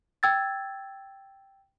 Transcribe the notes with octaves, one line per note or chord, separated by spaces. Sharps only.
G5 E6 G#6 A6